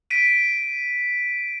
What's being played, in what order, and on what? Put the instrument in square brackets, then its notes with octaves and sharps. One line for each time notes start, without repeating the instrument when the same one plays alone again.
[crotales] B6 D7 D#7